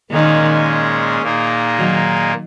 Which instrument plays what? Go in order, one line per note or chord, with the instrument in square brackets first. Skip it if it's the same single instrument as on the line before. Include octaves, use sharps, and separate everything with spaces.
[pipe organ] A#2 G#3 C#4 G#4 [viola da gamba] D#3
[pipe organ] A#2 A#3 D#4 G#4
[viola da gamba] D#3 F#3